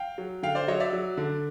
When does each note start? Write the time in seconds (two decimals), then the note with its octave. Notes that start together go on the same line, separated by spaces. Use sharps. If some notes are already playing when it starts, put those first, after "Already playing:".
Already playing: F5 G5
0.18 F#3
0.43 D3 F5 G5
0.55 C5 D5
0.68 F#3 C#5 D#5
0.80 D5 E5
0.93 F#3
1.17 D3